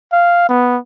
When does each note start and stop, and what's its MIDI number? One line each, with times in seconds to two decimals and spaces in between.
0.13 0.47 77
0.49 0.78 59